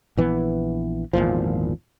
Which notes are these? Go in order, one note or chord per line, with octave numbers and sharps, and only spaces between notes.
A#1 E3 B3
G#1 E2 A#2 F3